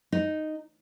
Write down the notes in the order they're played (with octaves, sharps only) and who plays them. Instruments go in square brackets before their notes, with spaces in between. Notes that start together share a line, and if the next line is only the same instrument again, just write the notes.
[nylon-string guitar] D#4